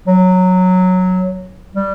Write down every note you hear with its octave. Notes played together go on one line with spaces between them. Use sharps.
F#3
G3